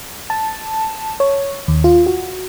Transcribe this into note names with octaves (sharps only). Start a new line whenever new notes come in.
A5
C#5
D#2
F4
F#4